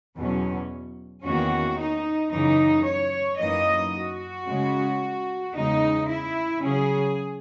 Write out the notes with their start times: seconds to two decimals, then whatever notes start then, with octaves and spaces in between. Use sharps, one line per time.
0.19 E2 B2 F#3 C#4
1.25 E2 D#3 A#3 C#4 F#4
1.79 D#4
2.33 F#2 C#3 E3 D#4
2.86 C#5
3.40 F#2 E3 A#3 D#4 D#5
3.93 F#4
4.47 C#3 G#3 C#4
5.54 E2 C#3 G#3 D#4
6.07 E4
6.61 C#3 F#3 C#4 G#4